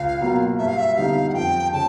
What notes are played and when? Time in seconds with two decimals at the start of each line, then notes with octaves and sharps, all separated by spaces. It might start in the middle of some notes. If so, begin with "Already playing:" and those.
Already playing: C#2 F5
0.21 B2 F#3 A#3
0.58 G2 E5
0.68 F5
0.78 E5
0.96 D3 G3 B3 D#4 F5
1.29 F#5
1.34 F2 G5
1.73 C#3 A5